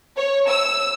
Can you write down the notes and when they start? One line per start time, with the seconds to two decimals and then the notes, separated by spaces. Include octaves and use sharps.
0.17 C#5
0.49 E6